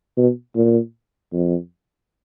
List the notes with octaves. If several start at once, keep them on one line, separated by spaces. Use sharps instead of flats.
B2
A#2
F2